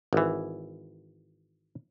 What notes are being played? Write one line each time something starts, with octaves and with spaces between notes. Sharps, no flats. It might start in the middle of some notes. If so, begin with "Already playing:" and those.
G#1 E3